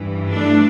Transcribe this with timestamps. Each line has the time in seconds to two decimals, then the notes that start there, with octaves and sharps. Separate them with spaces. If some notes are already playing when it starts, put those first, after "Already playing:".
Already playing: G2 E3
0.30 A3 D4